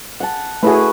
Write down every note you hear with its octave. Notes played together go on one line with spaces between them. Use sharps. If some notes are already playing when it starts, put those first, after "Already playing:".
F#5 A5
A3 E4 F#4 G#4 B4